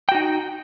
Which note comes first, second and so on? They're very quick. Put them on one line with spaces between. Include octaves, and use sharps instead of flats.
G5 F#4 D#4